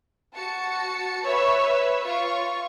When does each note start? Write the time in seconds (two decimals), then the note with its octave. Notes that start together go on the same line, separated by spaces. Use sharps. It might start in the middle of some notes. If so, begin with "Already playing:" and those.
0.34 F#4 A5 C#7
1.26 B4 C#5 E5 B5 E6
2.04 F4 C#6